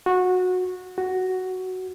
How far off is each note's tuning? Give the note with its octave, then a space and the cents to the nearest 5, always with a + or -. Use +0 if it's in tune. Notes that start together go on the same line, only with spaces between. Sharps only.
F#4 -20
F#4 +5